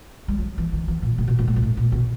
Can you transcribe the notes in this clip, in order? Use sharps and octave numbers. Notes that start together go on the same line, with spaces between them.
G3
F#3
E3
D#3
E3
A#2
A2
B2
A#2
A2
A#2
A2
A#2
B2